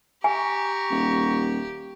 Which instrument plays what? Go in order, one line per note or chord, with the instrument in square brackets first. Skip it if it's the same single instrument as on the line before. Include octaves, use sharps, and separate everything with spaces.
[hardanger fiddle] G4 [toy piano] G#5 [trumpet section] A#5 C#6
[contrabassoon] D#1